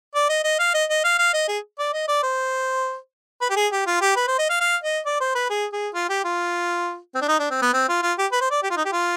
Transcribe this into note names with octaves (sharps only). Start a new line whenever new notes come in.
D5
D#5
D#5
F5
D#5
D#5
F5
F5
D#5
G#4
D5
D#5
D5
C5
B4
G4
G#4
G4
F4
G4
B4
C5
D#5
F5
F5
D#5
D5
C5
B4
G#4
G#4
F4
G4
F4
C4
D4
D#4
D4
C4
B3
C4
F4
F4
G4
B4
C5
D5
G4
F4
D#4
G4
F4